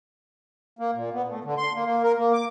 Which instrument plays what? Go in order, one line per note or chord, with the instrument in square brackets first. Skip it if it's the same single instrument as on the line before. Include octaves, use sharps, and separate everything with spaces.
[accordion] A#3
A#2
B3
A2
D3
C6
A#3
A#3
A#4
A#3
D6